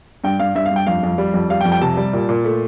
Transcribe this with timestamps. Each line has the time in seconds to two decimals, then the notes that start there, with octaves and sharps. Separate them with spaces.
0.24 G2 G5
0.39 G2 F5
0.55 G2 E5
0.66 F5
0.71 G2 G5
0.87 F2 F5
1.03 F2
1.18 G3
1.34 F2
1.50 G3 F5
1.61 G5
1.66 F2
1.72 G5
1.81 C3 A5
1.97 G3
2.13 A#2
2.29 A#2
2.45 A3